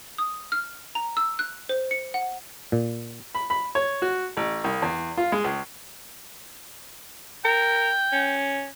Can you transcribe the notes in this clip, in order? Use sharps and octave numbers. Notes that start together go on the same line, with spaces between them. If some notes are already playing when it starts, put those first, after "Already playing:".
D#6
F6
A#5
E6
F#6
C5
C#7
F#5
A#2
B5
B5
C#5
F#4
A1
C2
E2
F4
G#3
C#2
A#4 G5
C#4